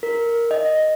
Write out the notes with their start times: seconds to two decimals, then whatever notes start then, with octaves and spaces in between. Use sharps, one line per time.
0.03 A#4
0.51 D#5